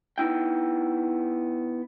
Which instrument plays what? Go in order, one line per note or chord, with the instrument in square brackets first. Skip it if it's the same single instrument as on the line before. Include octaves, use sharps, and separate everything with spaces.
[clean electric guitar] B3 D#4 E4 G5